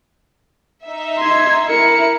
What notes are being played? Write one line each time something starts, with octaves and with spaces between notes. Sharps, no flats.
D#4 E5
C6 G#6
E4 A#4 C#7